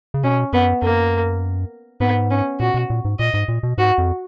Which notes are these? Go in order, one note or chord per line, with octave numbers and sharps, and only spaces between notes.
C#3
B2 C#4
F#2 B3
F#2 A#3
G#2 B3
C#4
A#2 F#4
B2
A#2
G#2
A#2 D#5
G#2
A#2
B2
G#2 F#4
F2